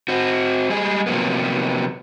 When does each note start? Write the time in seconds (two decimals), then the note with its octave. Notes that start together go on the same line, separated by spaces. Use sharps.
0.08 C4 F#4
0.70 G3 G#3 G#4
1.06 C3 F3 F#3 A#3 B3